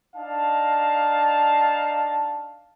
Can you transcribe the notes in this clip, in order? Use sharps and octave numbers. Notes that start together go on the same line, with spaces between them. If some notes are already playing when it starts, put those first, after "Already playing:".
D4 D#4 F5 A5